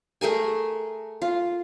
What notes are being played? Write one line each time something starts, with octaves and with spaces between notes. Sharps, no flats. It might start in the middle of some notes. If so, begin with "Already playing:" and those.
A3 G#4 A#4 G#5
F4